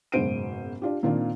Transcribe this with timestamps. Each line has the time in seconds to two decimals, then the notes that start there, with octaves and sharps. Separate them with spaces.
0.12 F#1 G#2 B2 C5 D7 D#7
0.82 D4 F4 G4
1.03 A#2 D#3 A#3 C4 D4 F4